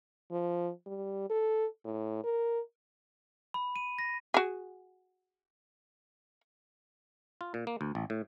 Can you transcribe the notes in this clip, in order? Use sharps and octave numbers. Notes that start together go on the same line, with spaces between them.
F3
G3
A4
A2
A#4
B5
D#7
A#6
F#4 G#4
F4
A#2
A#3
D2
A1
A2